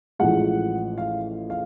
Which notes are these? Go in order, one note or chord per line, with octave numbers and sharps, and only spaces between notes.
A1 A2 F3 G#3 F#5
F5
F5